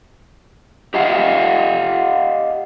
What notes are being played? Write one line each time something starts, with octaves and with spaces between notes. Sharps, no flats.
G4 D#5 F5 F#5